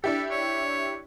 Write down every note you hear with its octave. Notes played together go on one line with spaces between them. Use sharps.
D4 E4 G4 A4
C#5